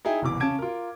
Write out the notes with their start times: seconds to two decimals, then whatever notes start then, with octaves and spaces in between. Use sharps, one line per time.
0.05 D#4 E4 G#4 E5 G5
0.22 F#1 C2 B2 E3 D6
0.40 C#3 C#4 A5 G#6 D7
0.59 F4 A#4